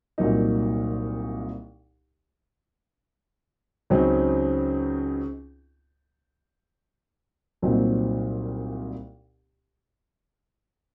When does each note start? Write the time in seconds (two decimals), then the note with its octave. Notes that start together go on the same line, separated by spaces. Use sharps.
0.18 C2 A#2 F#3 A#3 D#4
3.90 C#2 C#3 F#3 C4 D#4
7.62 C2 A#2 F#3 C4 D#4